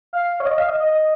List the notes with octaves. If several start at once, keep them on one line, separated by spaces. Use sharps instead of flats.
F5
C#5
D#5
F5
D#5
D#5